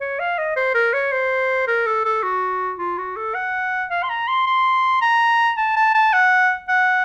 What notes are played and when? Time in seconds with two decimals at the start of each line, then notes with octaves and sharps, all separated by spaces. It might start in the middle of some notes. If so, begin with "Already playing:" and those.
0.01 C#5
0.20 F5
0.38 D#5
0.56 C5
0.75 A#4
0.93 C#5
1.12 C5
1.67 A#4
1.86 A4
2.05 A4
2.23 F#4
2.78 F4
2.98 F#4
3.17 A4
3.35 F#5
3.90 F5
4.03 C6
4.10 A#5
4.28 C6
4.47 C6
5.02 A#5
5.57 A5
5.76 A5
5.95 A5
6.13 F#5
6.69 F#5